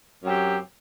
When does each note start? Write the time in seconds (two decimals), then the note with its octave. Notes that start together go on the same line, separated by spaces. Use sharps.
0.22 F#2 F#3 C4 G4